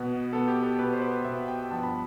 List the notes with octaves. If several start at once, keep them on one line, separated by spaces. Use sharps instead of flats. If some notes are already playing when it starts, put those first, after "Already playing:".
Already playing: B2 B3 B4
B2 B3 A4
G4
A4
B2 B3 B4
C5
B4
B2 B3 E5
G5
G2 F3 B3 A5
B5